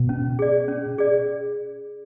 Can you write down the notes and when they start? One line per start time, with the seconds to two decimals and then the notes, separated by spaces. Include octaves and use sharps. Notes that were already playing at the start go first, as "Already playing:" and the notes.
Already playing: B2
0.09 C#4
0.39 G#4 D5
0.68 C#4
0.98 G#4 D5